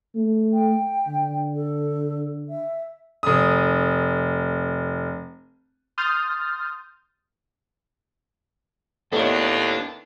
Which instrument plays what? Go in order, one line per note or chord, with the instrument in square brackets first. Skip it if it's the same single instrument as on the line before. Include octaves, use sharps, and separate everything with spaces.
[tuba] A3
[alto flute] G5
[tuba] D3
[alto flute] A4
E5
[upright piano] F1 D#6
[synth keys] C6 D#6 F6 G6 A6
[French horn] D#2 [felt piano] B3 C#5 [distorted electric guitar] D4 [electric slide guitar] E4 A4